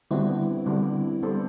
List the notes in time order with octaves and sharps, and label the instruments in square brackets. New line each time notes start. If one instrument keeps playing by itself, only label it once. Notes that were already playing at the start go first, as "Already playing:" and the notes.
[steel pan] D3 G3 B3 D4 F#4 [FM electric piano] C4 E4
[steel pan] D3 G3 B3 D4 F#4
G3 B3 D4 A4 C5